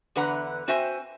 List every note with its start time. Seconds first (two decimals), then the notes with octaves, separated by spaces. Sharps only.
0.16 E2 D3 B4 F#5 A#5
0.68 C4 F#4 C5 E5 G5 G#5